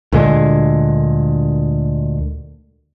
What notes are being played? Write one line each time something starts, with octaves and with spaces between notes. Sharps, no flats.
D2 A#2 D3 G#3